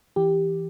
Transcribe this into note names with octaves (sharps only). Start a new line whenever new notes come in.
E3 G4